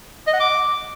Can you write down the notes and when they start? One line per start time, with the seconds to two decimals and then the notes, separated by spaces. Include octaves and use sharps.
0.27 D#5
0.34 F#5
0.40 D6